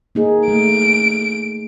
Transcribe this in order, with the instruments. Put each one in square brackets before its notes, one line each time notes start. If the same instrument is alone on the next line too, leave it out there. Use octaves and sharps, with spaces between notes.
[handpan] A#3 D#4 G#4
[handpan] A3 [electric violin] D7